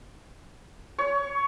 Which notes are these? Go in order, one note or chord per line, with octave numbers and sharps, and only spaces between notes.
C#5